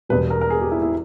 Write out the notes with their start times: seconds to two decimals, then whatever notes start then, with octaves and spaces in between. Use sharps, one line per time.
0.09 E1 E2 B2 G3 B4
0.30 A#4
0.41 A#4
0.50 G#4
0.61 G4
0.71 E4
0.82 E4